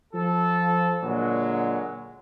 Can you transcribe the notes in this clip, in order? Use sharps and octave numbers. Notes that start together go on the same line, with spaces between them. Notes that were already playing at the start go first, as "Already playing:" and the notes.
F3 A4
A#2 D3 F#3 G#3